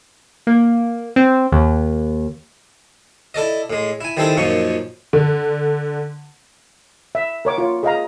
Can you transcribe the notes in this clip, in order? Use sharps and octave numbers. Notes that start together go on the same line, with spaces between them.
A#3
C4
D#2
E4 A4 D5 D#5
A2 G#3
E4 G#5
D#3 G3 C4 E4 G#4 A4
F#2 A#2 F3 C#4 D#4 C#6
D3
E5
A#4 C#5 D6
F4 C#5
G#4 D#5 F5 A#5